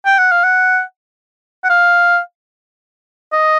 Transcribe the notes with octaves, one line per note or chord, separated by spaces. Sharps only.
G5
F#5
F5
F#5
F#5
F5
D#5